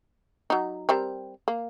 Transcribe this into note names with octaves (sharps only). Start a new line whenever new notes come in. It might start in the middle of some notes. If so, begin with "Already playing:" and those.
F#3 D#4
G3 C4 A#4
A#3